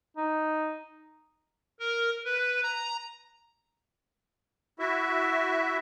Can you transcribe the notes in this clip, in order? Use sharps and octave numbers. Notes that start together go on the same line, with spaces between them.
D#4
A#4
B4
A#5
E4 F#4 E5